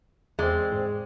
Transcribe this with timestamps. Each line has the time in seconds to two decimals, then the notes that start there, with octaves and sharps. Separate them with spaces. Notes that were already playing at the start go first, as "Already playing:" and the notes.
0.39 E2 G#3 C4 D5
0.72 G#2